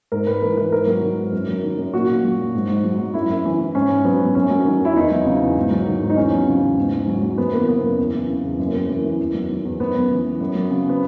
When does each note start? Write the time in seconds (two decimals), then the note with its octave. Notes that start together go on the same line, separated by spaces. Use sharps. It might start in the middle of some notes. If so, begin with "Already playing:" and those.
0.12 G#2 A#4
0.26 G#2 B4
0.42 E3 A#4
0.57 E3 B4
0.72 G#2 A#4
0.87 F#3
1.02 D#3
1.18 G#2
1.33 F#2
1.48 F#3
1.63 D#3
1.78 F#2
1.93 A#2 F#4
2.08 A#2
2.24 F#3
2.39 F#3
2.54 G#2
2.69 G#2
2.84 F#3
2.99 F#3
3.14 F#2 E4
3.29 F#2
3.45 E3
3.59 E3
3.75 G#2 C#4
3.90 G#2
4.04 F#3 B3
4.21 F#3
4.35 F#2 C#4
4.50 F#3
4.65 D#3
4.81 F#2 E4
4.96 E2 D#4
5.11 F#3
5.26 C#3
5.41 E2
5.56 G#2
5.71 F#3
5.87 D#3
6.01 G#2
6.10 D#4
6.17 E2 C#4
6.32 F#3
6.47 C#3
6.62 E2
6.77 G#2
6.93 G#2
7.08 F#3
7.22 F#3
7.38 F#2 B3
7.53 E3 A#3
7.68 C#3 B3
7.83 F#2
7.99 E2
8.14 E3
8.28 C#3
8.43 E2
8.59 F#2 A#3
8.73 F#2
8.89 E3
9.04 E3
9.19 E2
9.34 F#3
9.49 D#3
9.65 E2
9.80 F#2 B3
9.95 F#2
10.09 E3
10.25 E3
10.40 F#2
10.55 F#3
10.70 C#3
10.89 B3